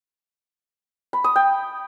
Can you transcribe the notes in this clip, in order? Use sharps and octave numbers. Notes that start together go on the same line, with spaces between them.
B5
D#6
G5